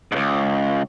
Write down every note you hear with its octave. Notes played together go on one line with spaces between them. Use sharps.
C#2 G#2